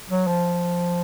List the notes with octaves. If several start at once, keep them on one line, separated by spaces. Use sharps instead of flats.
F#3
F3